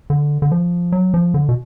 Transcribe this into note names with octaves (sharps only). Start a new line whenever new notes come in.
D3
D3
F3
F#3
F3
D3
B2